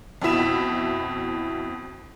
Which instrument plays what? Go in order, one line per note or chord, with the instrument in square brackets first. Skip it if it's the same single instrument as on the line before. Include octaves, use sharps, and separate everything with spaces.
[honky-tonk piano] F2 B2 E4 E7